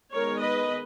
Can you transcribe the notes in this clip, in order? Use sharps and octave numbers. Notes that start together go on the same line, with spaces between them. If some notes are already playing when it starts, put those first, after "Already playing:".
D#3 G#3 B3 A#4 C#5
B4 D#5